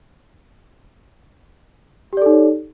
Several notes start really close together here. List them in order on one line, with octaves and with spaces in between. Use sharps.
G4 D5 A4 D#4 C#5